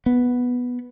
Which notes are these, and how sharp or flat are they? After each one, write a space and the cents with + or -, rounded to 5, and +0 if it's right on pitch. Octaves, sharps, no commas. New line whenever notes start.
B3 -5